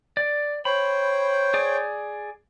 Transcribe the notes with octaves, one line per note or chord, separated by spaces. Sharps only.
D5
C5 C#5 G5 B5
G#4 D5